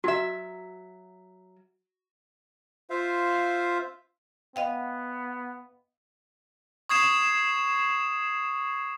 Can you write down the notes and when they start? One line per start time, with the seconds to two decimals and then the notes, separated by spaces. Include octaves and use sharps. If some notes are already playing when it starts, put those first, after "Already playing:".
0.04 F#3 F#4 E5
2.90 F4 C5 E5 F5
4.56 B3 D#5 F5 G5
6.89 C#6 D#6 G#6 C7 E7